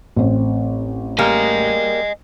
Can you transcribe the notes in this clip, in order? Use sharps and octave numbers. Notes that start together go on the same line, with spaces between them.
A1 C4
G3 A#3 D#5 G#5